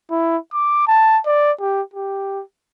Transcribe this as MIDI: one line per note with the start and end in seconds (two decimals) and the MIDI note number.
0.11 0.37 64
0.53 0.86 86
0.87 1.19 81
1.26 1.52 74
1.61 1.82 67
1.94 2.42 67